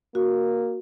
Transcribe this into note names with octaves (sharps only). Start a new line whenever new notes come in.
A#3 F#4